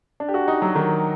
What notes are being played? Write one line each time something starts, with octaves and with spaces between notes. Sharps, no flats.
D4
G4
F#4
D#4
F#3
D#3